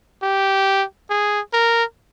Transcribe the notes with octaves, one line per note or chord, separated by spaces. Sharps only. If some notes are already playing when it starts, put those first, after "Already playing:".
G4
G#4
A#4